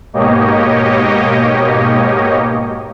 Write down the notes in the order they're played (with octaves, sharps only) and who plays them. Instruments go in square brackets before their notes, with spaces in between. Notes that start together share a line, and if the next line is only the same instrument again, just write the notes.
[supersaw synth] G#2 B2 A#3 G4 C#5 D#5